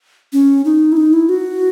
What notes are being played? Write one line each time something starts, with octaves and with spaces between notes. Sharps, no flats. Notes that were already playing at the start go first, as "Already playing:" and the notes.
C#4
D#4
E4
D#4
E4
F#4